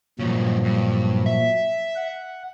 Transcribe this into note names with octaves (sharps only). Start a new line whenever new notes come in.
G2 A#2 C#3 F3 F#3
G2
E5
F#5